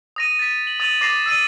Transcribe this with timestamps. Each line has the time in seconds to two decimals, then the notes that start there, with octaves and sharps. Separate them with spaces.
0.16 D#6 A#6 D#7
0.39 A6 B6
0.67 F#7
0.80 D#6 A6 D#7 F#7
1.01 D6 D#6 A6 A#6 C7 E7
1.26 E6 A6 D#7